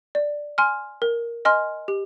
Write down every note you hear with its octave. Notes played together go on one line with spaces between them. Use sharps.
D5
G#5 C6 F6
A#4
D#5 G#5 C6 F6
G4